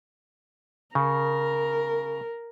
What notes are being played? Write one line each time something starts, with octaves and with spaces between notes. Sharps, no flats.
C#3 A#4